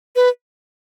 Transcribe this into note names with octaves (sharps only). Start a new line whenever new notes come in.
B4